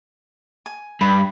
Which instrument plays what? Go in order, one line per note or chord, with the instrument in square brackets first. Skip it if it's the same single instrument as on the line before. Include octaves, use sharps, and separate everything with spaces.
[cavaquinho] G#5
[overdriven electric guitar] G2 [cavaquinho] B5